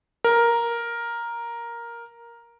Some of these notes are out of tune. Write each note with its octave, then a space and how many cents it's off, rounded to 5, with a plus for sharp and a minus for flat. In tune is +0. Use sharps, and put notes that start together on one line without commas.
A#4 +5